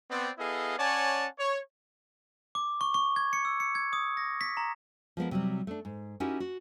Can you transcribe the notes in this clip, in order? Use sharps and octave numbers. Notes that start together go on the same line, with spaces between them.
B3 C4 D5
B3 E4 G#4 A4 D#5 F5
C#4 C#5 D5 F#5 G#5 A5
C#5
D6
C#6
C#6
G#6
C#7
E6
C#7
G#6
D#6
A#6
B6
A#5
F3 G#3 B3 A#4
C3 F#3 G3
A3 D4
G#2
C#4 D#4 E4 F#4 G4 A#4
F#4